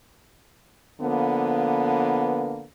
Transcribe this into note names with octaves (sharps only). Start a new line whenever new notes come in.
D3 F3 A#3 B3